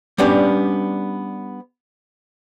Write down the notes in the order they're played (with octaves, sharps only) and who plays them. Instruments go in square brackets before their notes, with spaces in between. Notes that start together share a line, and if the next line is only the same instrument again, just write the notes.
[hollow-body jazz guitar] G3 B3 C#4 D4 G4